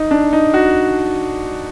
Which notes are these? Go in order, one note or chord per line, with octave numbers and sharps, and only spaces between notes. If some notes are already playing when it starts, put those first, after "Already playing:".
Already playing: D#4
D4
D#4
F#4